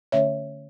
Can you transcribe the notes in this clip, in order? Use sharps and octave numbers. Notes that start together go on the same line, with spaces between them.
D3 A3 C#4 C#5 E5